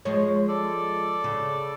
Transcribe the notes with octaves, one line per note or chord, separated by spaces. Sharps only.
F3 G#3 C#5
A4 D5
C#3